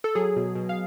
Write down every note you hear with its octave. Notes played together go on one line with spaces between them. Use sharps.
A4
F#3 G#4
B2
B2
F5